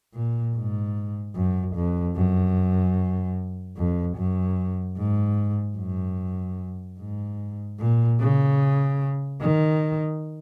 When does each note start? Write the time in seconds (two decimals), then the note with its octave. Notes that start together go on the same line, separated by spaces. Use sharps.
0.14 A#2
0.55 G#2
1.36 F#2
1.76 F2
2.16 F#2
3.77 F2
4.17 F#2
4.97 G#2
5.77 F#2
6.99 G#2
7.79 A#2
8.20 C#3
9.41 D#3